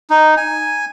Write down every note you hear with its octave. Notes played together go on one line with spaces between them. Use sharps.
D#4
G#5